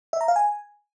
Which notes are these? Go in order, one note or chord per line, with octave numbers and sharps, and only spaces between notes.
E5
A#5
F5
G#5